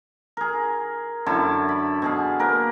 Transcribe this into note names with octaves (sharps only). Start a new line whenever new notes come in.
G#4 A#4
F#2 D3 E4 A5
B5
B2 G#4 F5
A#3 A#4 B4